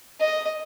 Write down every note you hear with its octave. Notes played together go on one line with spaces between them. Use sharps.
D#5